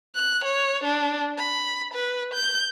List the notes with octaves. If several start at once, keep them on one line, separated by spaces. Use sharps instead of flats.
F#6
C#5
D4
B5
B4
G6